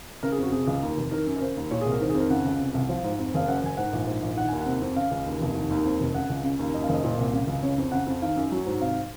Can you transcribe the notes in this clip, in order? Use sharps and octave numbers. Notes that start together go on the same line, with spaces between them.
C#3 A#4
G#4
F2 F#4
C3 G#4
C#2
D#2
F1
D#3 A#4
F#2
A#4
C#3 C5
D#2
A#2 C#5
C2 G#4
A#4
D#3 C5
G#4
F2 C5
A#4
C#3 F#5
C#2
C3
C2
F3
G#2
F2
F#1 F5
F#2 F#5
F#1 G#5
G#2 F#5
A#1
G#2
A#1
D#3 F#5
D#2 G#5
F#5
C3
F2
C#3 F5
C#2
D#2
F1
D#3
D#2
F2
F1
C#3 F#5
C#2
C#3
D#2
F#2 D#5
F5
F#1
D#5
A#2
C2
C#3
C#2
C#3 C#5
F2
C#3 F#5
F2
D#3 F5
F#2
F#3
G#2
C3 F5